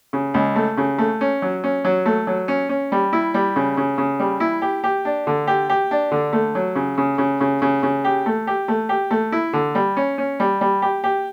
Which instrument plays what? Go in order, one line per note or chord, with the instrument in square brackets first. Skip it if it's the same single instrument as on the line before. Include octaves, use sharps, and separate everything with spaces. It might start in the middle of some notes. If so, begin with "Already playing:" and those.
[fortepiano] C#3
C#2
A3
C#3
A3
C#4
F#3
C#4
F#3
A3
F#3
C#4
C#4
G3
E4
G3
C#3
C#3
C#3
G3
E4
G4
G4
D4
D3
G4
G4
D4
D3
A3
F#3
C#3
C#3
C#3
C#3
C#3
C#3
G4
A3
G4
A3
G4
A3
E4
D3
G3
C#4
C#4
G3
G3
G4
G4